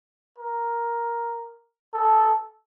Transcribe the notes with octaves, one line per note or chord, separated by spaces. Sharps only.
A#4
A4